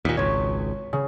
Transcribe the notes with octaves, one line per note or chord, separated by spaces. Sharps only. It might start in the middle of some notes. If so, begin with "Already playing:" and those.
D#2 A#2 B6
G#1 C#2 C#5
C#3